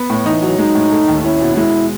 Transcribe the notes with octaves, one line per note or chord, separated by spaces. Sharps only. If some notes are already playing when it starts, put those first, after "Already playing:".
Already playing: B3
A2
E3 D#4
F#3
G#3 D#4
A2
A3
D#2
C#4 E4
B2
G#3 E4